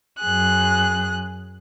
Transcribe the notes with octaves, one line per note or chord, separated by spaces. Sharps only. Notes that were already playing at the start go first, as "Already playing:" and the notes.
F#2 G#4 F#6